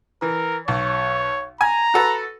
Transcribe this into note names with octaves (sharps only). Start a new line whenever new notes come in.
E3 A#4
B1 C#5
G#5 A#5
F#4 A4 B4